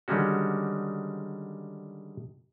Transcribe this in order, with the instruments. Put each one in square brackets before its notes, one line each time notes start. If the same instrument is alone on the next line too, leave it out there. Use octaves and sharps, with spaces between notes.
[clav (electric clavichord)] D3 D#3 G3 G#3 C#4 F#4